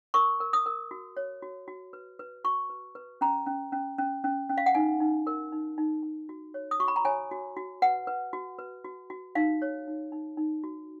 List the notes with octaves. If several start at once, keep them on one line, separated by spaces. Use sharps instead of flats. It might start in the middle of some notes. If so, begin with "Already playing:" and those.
A#4 C#6
A#4
D#6
A#4
F#4
C#5
F#4
F#4
B4
B4
F#4 C#6
B4
B4
C#4 A#5
C#4
C#4
C#4
C#4
C#4
F5
F#5
D#4 G#5
D#4
A#4
D#4
D#4
D#4
F#4
C#5
D#6
F#4 C#6
B5
A#5
C#5 G#5
F#4
F#4
B4 F#5
B4
F#4
B4
F#4
F#4
D#4 F5
C#5
D#4
D#4
D#4
F#4